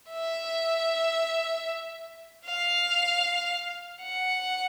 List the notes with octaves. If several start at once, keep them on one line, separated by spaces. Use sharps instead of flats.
E5
F5
F#5